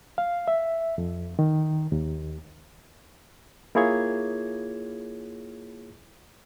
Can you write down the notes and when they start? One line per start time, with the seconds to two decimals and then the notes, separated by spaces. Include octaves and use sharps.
0.18 F5
0.48 E5
0.98 F2
1.39 D#3
1.92 D#2
3.75 A#3 E4 F4 G#4 C#5 G#6